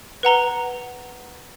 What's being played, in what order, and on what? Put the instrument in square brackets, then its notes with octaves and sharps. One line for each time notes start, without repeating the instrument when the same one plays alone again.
[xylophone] B4 F#5 A#5 G7